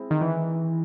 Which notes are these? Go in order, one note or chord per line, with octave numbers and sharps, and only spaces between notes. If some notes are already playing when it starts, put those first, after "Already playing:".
Already playing: G#3 C4 E4
D#3
E3